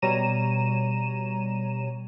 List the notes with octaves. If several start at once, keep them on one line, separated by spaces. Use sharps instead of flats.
B2 G3 C#5 A#5 D#7 E7